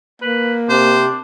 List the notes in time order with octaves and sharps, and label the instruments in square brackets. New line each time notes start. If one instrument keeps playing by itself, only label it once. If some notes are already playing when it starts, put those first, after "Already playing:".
[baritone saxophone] A#3 [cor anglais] B4
[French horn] C3 [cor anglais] D4 [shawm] C5